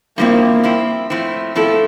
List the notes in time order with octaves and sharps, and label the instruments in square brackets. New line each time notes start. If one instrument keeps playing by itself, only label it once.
[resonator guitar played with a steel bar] G2 F3 C4 E4 [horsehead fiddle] A#3
[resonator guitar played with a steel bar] G2 F3 C4 E4
A2 F3 C4 E4
[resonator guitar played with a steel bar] A2 F3 C4 E4 [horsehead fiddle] A4